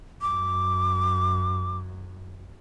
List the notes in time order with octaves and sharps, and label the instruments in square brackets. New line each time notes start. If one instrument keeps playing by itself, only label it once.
[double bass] F#2 [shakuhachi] D6